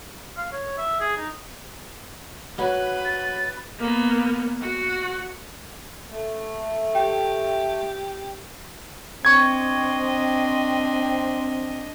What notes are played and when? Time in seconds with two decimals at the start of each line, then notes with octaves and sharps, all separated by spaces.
0.37 F5
0.52 C#5
0.78 E5
1.00 G#4
1.17 D#4
2.59 F#3 B4 F#5
3.05 A6
3.79 A#3 B3
4.61 F#4 F#5
6.11 A3
6.95 G4 G5
9.25 C4 D4 D#5 C#6 G#6